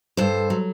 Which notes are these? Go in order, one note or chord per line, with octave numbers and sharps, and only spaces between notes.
G2 A4 C5
F#3